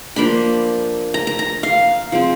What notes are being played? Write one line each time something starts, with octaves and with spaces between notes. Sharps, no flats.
F3 A#3 D4 B5
A#5
A#5
A#5
F5
F3 G#3 C4